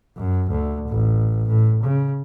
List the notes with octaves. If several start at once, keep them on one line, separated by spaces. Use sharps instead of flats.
F#2
D2
A1
A2
C#3